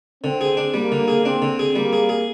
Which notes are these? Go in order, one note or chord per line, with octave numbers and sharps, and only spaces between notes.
D3 C4
G#4
D4
G3 A#3
D3
G#4
C4 D4
D3
G#4
G3 A#3
G#4
G#4